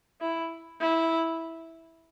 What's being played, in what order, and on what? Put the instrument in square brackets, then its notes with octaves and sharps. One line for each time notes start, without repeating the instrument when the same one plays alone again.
[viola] E4
E4